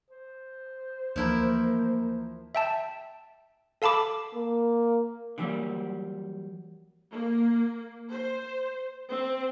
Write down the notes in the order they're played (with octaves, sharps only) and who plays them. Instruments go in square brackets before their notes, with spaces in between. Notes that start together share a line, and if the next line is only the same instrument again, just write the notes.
[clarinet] C5
[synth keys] D2 E3 [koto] F3 E4 A#4 [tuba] A#3
[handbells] E5 G5 A5
A4 F5 A5 B5 D6
[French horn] A#3
[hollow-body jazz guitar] D3 E3 F#3 G3 A#3
[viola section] A#3
C5
C4